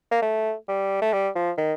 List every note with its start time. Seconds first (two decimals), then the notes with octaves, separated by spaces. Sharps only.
0.11 A#3
0.22 A3
0.68 G3
1.02 A3
1.13 G3
1.35 F3
1.57 D#3